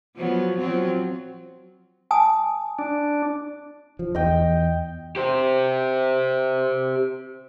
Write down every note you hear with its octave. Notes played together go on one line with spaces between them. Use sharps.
F3 F#3 B3
F3 F#3 C4
G#5 A5 D#6
D4
F3
E2 D#5 G5
G4 C5